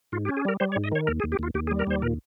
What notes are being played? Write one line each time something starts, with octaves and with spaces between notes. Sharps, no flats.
G#2 F4
G4
C#4
G#4
G3 A#4
G3 C5
C#5
G#2
D#5
D#3 C#5
D#2 A#4
G#4
D#2
G4
D#2 F4
D#2 G4
G#4
G3
A#4
D#2 C5
A#2 A#4